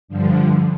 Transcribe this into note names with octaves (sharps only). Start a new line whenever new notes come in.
G2 D3 F3